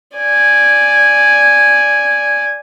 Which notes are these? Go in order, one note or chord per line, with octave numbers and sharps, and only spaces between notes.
D5 G#5